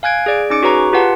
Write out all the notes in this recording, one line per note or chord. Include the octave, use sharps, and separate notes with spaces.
F5 G#5 F#6 G#6 D7
G#4 D5 D7
C#4 D#4 D6 C#7 D7
F#4 G#4 B4 C#5 A#5 C#6
F4 G4 B4 F#5 A5